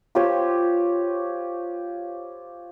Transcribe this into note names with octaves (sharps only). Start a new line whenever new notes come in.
F4 G4 C5 C#5